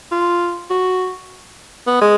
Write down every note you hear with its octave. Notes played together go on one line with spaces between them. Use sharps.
F4
F#4
B3
G#3